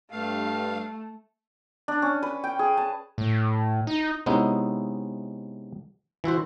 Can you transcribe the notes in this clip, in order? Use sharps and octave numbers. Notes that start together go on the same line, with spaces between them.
G2 A3 F5
D4
C#4
B4
G5
G#4
A5
A2
D#4
C3 G#3 B3 C#4 D#4 E4
E3 E4 F#4 C5